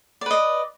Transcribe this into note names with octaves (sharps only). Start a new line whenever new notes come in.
B4 D5 D#5